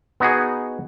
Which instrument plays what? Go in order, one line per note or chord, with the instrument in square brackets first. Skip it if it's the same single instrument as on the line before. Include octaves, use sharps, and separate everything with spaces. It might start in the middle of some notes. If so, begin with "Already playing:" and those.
[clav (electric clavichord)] B3 D#4 F#4 G#4